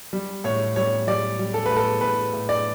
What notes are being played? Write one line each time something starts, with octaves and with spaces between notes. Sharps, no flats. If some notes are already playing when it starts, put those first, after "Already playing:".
G3
A2 C#5
G3 C#5
G3 D5
G3
A4
B4
A2
A4
A2 B4
A2
D5